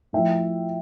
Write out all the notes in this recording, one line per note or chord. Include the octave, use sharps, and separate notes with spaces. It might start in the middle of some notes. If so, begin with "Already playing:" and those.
A2 F3 E5 G5